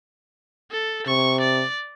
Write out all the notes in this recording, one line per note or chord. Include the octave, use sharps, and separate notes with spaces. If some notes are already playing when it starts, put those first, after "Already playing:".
A4
C3 C#6
D5